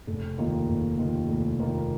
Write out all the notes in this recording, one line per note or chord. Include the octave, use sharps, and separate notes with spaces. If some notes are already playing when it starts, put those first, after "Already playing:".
F1
D#2 D#3 A#3 F4
F1
D#2 D#3 A#3 F4
F1
D#2 D#3 A#3 F4